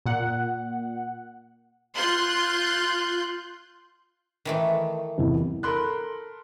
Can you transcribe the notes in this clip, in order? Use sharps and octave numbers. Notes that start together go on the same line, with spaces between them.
A#2 F#5
F4 C6 F#6 G6
D#3 E3 A3
E2 C3 E4
A4 A#4 B5 C6 F#6